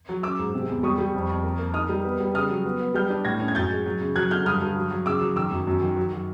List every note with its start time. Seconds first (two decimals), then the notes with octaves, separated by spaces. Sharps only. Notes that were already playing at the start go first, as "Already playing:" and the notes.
0.09 F#3
0.23 C#4 D6 E6
0.39 G#2
0.54 C3
0.69 E2
0.83 G3 C#6 D#6
0.98 G3
1.14 F2
1.29 F2
1.44 A#3
1.59 A#3
1.74 D#4 D#6 F6
1.89 G3
2.04 B3
2.20 G3
2.34 C#3 D#6 F6
2.50 F#3
2.65 B3
2.80 B3
2.94 G3 F6 G6
3.10 D4
3.25 A2 G#6 A#6
3.40 C#4
3.48 G#6
3.55 F#2 G6 A6
3.70 G#3
3.86 F#3
4.01 C#3
4.16 F#3 F#6 G#6
4.31 D3 F6 G6
4.45 G2 D#6 F6
4.62 G2
4.76 F#3
4.91 F#3
5.06 C#3 D6 E6
5.21 F#3
5.36 D#3 D6 E6
5.51 F#2
5.67 F#2
5.81 D#3
5.97 F#3
6.13 F#3